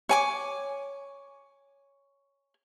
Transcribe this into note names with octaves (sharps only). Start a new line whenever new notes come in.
C#5 G#5 D6